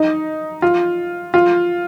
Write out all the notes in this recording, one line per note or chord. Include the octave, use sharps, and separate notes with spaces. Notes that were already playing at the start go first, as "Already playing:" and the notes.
Already playing: D#4
F4
F4